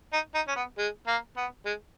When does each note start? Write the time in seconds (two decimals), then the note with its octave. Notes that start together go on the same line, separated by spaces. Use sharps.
0.13 D#4
0.34 D#4
0.48 C#4
0.56 B3
0.78 G#3
1.07 A#3
1.37 B3
1.66 G#3